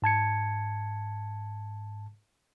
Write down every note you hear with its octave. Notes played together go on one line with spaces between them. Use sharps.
G#2 A5 G#6 C#7